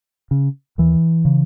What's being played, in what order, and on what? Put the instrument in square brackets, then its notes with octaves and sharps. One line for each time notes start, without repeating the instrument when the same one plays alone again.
[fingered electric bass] C#3
D#2 E3
C#3